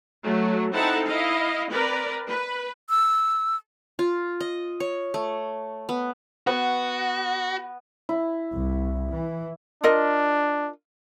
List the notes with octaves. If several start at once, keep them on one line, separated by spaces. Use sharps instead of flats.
F#3 A3
C4 D#4 E4 A4 F#5 A5
E4 D#5 F5
C4 A#4 B4 D5
B4
E6
F4
D#5
C#5
A3
B3
B3 F#4
E4
C2
E3
D4 F4 A#4 D#5